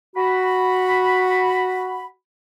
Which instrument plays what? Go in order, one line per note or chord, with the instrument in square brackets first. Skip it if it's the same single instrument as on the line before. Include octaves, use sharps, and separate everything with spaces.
[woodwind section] F#4 B5